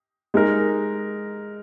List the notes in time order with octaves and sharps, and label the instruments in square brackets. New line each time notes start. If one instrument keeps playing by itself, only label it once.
[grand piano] G#3 D#4 A#4